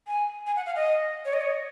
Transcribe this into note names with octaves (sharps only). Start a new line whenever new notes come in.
G#5
G#5
F#5
F5
D#5
C#5
D#5
C#5